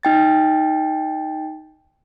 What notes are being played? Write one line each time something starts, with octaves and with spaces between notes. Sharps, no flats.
D#4 G5 A6